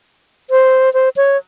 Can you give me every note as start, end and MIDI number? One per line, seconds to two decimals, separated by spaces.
0.50 0.92 72
0.94 1.09 72
1.16 1.37 73